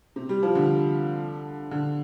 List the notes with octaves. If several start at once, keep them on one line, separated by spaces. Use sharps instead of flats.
C3
G3
F3
D3
D3